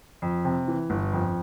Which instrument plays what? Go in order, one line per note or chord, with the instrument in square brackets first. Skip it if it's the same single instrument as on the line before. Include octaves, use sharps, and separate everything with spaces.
[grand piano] F2
C3
E3
G1
F2